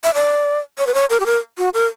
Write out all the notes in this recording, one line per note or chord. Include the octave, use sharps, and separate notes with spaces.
E5
D5
C#5
B4
C#5
A#4
G4
A#4
F#4
A#4